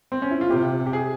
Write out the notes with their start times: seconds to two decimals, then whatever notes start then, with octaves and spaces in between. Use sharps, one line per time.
0.12 C4
0.22 C#4
0.31 E4
0.41 F4
0.49 C3 G4
0.86 G4
0.93 G#4